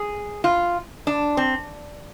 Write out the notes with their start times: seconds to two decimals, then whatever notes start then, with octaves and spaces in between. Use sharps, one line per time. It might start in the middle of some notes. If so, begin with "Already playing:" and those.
Already playing: G#4
0.44 F4
1.07 D4
1.37 C4